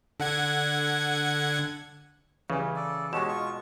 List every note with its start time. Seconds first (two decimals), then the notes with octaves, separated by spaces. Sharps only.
0.20 D3 F#5 G#6
2.50 C#3 E3 G3
2.76 A4 D5
3.13 B2 G#3 D4 G4 C#5 E7
3.29 F4 C#6